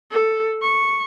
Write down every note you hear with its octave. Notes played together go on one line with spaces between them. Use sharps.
A4
C#6